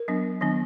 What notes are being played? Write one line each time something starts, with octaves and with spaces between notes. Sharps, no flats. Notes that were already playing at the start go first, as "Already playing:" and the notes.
Already playing: A#4
F#3 B3 D4
D#3 F#3 B3 D4